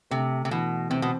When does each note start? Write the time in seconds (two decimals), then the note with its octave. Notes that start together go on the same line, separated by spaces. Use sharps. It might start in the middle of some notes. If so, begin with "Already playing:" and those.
0.11 C3 A3
0.45 C3
0.51 B2 E3
0.90 C3 C4
1.02 B2